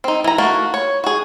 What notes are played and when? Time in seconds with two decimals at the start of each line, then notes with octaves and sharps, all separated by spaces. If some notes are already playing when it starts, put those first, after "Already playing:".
0.04 C4 D#4
0.24 E3 A#5
0.38 A3 A#3 F#4
0.74 C#5
1.04 F#4 G#4